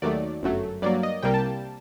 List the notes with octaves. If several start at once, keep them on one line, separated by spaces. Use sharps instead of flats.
D#2 D#3 F#3 A3 D5
G1 F#2 F#3 A3
G2 F#3 A#3 D5
D#5
C2 C3 G3 A#3 G5
A5